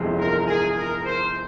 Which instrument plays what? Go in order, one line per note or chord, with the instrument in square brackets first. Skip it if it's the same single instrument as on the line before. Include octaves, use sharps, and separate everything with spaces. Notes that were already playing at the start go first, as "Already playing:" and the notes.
Already playing: [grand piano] G1 F2 C3 E3 G#3
[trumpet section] A#4
G#4
A#4
C5